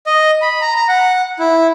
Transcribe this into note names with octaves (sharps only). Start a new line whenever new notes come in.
D#5
B5
A#5
A#5
F#5
E4